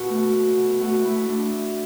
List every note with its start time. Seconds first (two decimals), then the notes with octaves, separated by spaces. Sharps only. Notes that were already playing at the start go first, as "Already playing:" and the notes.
Already playing: B2 F#4
0.09 A3
0.33 B2
0.57 B2
0.81 A3 F#4
1.05 A3 E4
1.28 A3 D4